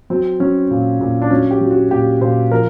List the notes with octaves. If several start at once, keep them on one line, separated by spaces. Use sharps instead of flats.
F#3 C4
F#3 C#4
A#2
A#2
D4
F#3 C#4
G4
F#3
F#4
A#2 G4
A#2 C5
F3 A#4